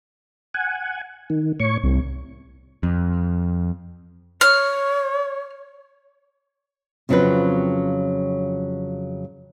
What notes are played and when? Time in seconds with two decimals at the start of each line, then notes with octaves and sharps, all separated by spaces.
0.54 F#5 G#5
1.30 D#3
1.60 A2 C#5 C#6
1.84 C2 C3
2.83 F2
4.41 C#5 F6
7.09 F2 C#3 F#3 C4 F4 B4